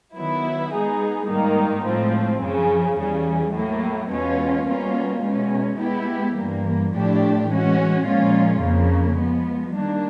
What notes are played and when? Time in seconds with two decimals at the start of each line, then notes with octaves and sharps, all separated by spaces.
0.15 D#3 F#3 B3 E4
0.72 G#3 B3 D#4 G#4
1.28 G#2 D#3 G3 A#3 D#4
1.85 A2 F3 G#3 C4
2.41 F#2 C#3 F3
2.97 E2 C#3 E3 G3
3.53 A2 F#3 A#3
4.09 E2 B2 G#3 C#4 F4
4.66 B2 G3 A#3 C#4 F4
5.23 E2 B2 G#3 C#4
5.79 G#3 B3 E4 G4
6.36 G2 E3 G3 A#3
6.92 A2 F3 A3 D4 G4
7.48 E3 G#3 C#4 F#4
8.05 A#2 F3 G#3 C#4 F4
8.62 F2 C#3 F3 A#3
9.18 F3 G#3 B3
9.74 D#3 G3 A#3 D4